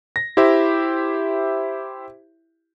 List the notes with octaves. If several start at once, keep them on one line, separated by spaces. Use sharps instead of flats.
A#6
E4 G4 C5 E5